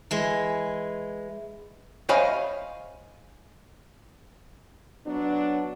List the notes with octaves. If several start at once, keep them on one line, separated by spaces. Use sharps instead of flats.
E3 G#3
C5 C#5 D#5 F5 G#5 B5
F#3 B3 D4